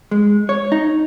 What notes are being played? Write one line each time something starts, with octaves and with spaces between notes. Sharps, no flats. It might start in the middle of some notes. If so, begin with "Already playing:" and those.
G#3
C#5
D#4